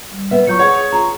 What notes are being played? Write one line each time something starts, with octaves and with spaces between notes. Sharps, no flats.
G3
B3 B4 E5
F#3 F4 C#6 G6 C#7
G#4 C#5 F#5
F4 A#5